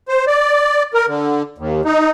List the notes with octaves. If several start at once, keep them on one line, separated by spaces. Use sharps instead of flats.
C5
D5
A#4
D3
D#2
D#4